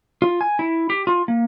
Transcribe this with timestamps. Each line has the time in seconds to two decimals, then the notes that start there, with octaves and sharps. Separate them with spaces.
0.22 F4
0.41 G#5
0.59 E4
0.90 G4
1.07 F4
1.28 A#3